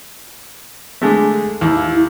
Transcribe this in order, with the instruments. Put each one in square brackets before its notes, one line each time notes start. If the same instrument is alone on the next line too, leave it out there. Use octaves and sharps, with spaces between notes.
[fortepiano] D3 G#3 A3
[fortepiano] D#2 [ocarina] E4